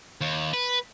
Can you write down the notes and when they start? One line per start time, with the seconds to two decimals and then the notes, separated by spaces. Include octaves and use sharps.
0.21 D#2
0.53 B4